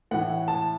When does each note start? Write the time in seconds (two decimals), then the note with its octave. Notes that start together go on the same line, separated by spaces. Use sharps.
0.11 A2 E3 F#5
0.48 A5